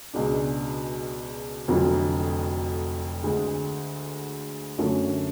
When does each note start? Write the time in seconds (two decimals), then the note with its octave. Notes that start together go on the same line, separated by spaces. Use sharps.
0.14 C#2 B2 G#3 D4
1.68 F1 F2 D3 F#3
3.23 D2 D3 G#3
4.79 F#2 D3 F#3 A3 C#4